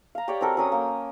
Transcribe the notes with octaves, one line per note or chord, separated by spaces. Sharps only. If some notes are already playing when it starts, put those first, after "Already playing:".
F5 A#5
G4 C#5 D5 G5
C4 F#4 A4 A#4
F#3 C#4 D#6
A#3 G5